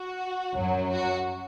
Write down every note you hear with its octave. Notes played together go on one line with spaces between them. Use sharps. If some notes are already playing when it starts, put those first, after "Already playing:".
Already playing: F#4
F#2 F#3
F#4